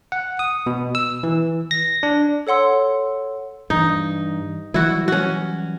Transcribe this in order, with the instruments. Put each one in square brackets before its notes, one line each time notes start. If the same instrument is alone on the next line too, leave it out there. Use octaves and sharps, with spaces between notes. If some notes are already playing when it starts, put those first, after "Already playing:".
[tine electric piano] F#5
D#6
B2
E6
E3
A#6
D4
[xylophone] A4 C#5 F#5 C6 E6
[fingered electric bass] G2 E3 [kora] D#4
[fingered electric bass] E3 F#3 G3 [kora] E4 F#4
[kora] C#4 F#4